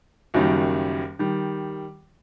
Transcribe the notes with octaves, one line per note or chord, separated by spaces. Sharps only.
F#1 F#2 D#3 G3
D#3 G3